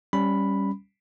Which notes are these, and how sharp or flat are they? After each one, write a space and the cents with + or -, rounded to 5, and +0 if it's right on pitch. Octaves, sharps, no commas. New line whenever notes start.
G3 +0 C#4 -5 B5 +0